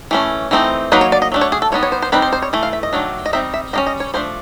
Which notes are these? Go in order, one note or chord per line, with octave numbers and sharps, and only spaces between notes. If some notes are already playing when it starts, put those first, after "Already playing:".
E3 A3 C#4
E3 A3 C4 D#4
F#3 A#3 D#4 B4
C#5
D5
D#5
F#3 A3 D4
C#5
G#4
A4
G3 B3 D#4 C#5
C#5
C5
C5
G3 C4 D#4 B4
C5
C5
C#5
E3 A3
F5
E5
D#5
D#3 F#3 A3 D4
D#5
G3 C4 D#4 E5
E5
G3 A#3 C#4 D#5
D#5
C#5
F3 A3 D4 C5